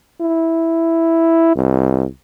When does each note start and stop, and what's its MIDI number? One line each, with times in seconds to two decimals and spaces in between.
0.21 1.53 64
1.55 2.04 36